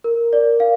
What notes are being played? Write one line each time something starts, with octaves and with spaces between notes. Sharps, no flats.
A#4
D5
F5